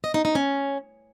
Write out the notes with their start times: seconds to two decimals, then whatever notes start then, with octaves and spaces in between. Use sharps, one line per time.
0.04 D#5
0.14 D#4
0.25 D#4
0.35 C#4